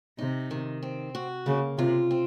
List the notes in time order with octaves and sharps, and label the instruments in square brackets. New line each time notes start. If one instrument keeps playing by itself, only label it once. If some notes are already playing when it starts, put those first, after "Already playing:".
[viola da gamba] C3 [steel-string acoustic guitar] D#4
[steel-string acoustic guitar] D#3
C4
F#4
[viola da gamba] C#3 [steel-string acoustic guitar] A#3
[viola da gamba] C3 [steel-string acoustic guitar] F4
[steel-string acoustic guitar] C4